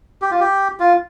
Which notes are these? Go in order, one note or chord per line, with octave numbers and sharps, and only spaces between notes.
G4
F4
G4
F4